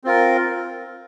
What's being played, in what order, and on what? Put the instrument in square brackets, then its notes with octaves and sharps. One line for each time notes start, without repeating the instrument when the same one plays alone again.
[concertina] C4 F4 A#4